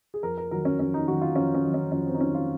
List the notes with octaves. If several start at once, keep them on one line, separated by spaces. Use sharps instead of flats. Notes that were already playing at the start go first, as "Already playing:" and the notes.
G#4
F2 A#4
A#4
D#3 F#3 A#4
C#4
F2 C#4
D#4
D#3 F#3 F#4
F4
F2 C#4
C#4
D#3 F#3
C#4
F2 C#4
C4
D#4
D#3 F#3 C#4
F4